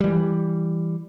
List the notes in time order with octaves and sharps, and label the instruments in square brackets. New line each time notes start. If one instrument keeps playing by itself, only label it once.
[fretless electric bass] E3 G3